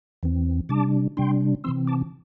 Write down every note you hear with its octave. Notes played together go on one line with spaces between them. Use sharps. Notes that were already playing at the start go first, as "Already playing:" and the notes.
E2 E3 C4
C3 G3 D4 A5 D6
C3 G3 D4 G5 C6
C3 E3 C4 C6 E6
A5 D6